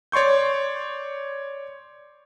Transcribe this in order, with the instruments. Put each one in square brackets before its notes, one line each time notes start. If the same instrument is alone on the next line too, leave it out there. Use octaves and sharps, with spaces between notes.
[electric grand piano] C#5 D5 C6 C#6 G6